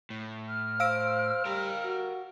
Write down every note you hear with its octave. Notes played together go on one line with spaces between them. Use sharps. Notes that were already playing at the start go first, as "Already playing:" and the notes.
A2
F6
C5 F5 E6 D7
G3 A#4 G5 A#5
F#4